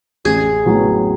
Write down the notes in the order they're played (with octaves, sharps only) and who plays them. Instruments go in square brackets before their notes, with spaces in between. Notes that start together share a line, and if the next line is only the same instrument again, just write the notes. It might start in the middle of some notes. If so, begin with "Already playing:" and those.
[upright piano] A1 [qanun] G#4
[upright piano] A2 F#3 B3